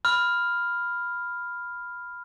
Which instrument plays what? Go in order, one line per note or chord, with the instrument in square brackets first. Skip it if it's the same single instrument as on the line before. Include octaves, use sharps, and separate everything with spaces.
[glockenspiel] B5 F6